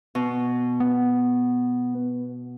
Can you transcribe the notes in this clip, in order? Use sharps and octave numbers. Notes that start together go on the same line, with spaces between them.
B2
B3